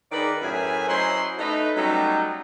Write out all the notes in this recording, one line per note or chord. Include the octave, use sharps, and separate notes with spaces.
D#3 G#4 B4 D5
F#2 A2 G#4 B4 E5 G#5
F#3 C#4 E4 C5 D#5 C6
A3 D#4 B4
F#3 G3 A3 C#4 D#4